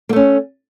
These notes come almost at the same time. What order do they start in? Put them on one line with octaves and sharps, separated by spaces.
A#3 A3 C#4